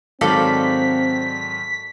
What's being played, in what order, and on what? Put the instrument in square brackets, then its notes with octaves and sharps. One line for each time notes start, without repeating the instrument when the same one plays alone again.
[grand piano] G#2 D#3 F#3 [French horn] C4 [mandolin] A4 D5 F5 [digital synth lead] B6